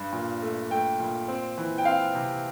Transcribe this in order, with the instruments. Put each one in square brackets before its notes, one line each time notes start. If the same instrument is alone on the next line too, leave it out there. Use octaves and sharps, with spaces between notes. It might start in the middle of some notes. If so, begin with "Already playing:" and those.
Already playing: [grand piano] G2
A#2
A3
A3 G5
A#2
C4
E3
G5
C4 F5
C3